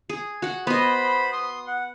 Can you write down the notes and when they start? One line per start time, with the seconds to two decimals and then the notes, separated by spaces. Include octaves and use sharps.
0.09 G#4
0.42 F#4 F#5
0.67 B3 C5 D#5 B5
1.32 C6 D#6
1.67 F#5